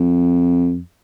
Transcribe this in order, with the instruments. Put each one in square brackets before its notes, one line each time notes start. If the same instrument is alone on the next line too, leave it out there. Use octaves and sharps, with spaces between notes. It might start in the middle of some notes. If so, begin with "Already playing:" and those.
Already playing: [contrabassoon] F2